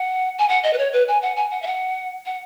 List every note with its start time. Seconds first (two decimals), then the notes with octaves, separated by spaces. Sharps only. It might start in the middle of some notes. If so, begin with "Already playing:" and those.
Already playing: F#5
0.38 G#5
0.49 F#5
0.63 D#5
0.73 B4
0.78 C#5
0.93 B4
1.08 G#5
1.22 F#5
1.36 G#5
1.51 F#5
1.62 E5
1.67 F#5
2.26 F#5